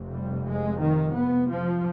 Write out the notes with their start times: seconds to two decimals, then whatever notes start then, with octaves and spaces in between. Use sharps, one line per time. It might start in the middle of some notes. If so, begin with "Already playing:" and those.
Already playing: F1 F2 C3
0.12 G3
0.46 G#3
0.81 D#3
1.14 B3
1.49 F3